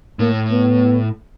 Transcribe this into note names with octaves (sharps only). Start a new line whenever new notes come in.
A2 A#3
B3